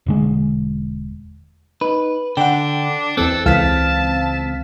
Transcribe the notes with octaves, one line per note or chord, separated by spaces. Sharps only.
E1 D3 G#3
D#4 B4
D3 D4 F#5 G5
E2 E3 C4 A4 F#6
C#2 E3 F5 A5 F6 B6